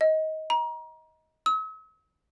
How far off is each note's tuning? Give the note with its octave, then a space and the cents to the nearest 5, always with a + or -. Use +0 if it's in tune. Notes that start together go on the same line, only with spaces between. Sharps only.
D#5 +20
A#5 +30
E6 -45